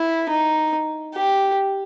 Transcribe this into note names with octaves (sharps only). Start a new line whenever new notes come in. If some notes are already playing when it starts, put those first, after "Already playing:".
Already playing: E4
D#4
G4